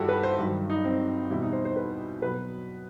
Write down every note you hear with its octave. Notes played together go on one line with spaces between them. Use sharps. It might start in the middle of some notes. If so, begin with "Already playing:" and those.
Already playing: G2 D#3 G3 E4 F#4 G4 A4
B4
C5
G2 D#3 F#3
D#4
C4
E2 B2 G3 E4
D#4
C5
C5
B4
B2 F#3 B4